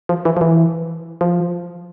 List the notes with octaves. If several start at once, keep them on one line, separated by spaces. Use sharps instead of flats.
F3
E3
F3
E3
F3